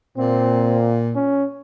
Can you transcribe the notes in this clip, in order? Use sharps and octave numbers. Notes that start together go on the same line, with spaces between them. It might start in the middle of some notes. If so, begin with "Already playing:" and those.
A#2 C4
C#4